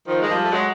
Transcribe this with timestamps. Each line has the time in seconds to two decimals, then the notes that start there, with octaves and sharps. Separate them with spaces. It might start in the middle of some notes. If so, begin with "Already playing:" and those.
0.07 D#3 F3
0.22 G#3
0.30 F3 G3
0.43 A3
0.52 F#3 G#3